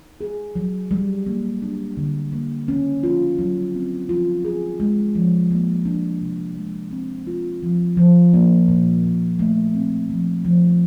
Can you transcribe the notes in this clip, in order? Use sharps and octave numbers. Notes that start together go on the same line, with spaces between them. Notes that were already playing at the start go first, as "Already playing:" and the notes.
Already playing: D#4
G#4
F#3
G3
A#3
D4
D3
A#3
C#4
F4
F#3
C4
F4
G#4
G#3
F3
A#3
D4
C3
G#3
C4
F4
F3
F3
A#3
A#2
A#2
A3
C4
F3
F3